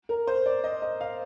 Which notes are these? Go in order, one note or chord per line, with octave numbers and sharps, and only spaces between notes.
A#4
C5
D5
D#5
D#5
F5